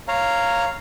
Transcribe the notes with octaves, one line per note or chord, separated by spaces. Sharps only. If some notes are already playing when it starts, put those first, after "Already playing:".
C#5 F5 A#5